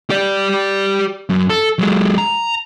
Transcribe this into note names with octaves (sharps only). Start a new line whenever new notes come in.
G4 D5
F#2
A4
F#3 G#3
A#5